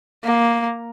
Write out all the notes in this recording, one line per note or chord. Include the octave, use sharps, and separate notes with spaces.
A#3